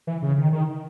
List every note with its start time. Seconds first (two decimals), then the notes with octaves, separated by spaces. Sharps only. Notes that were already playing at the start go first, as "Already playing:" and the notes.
0.07 E3
0.22 C#3
0.38 D#3
0.53 D#3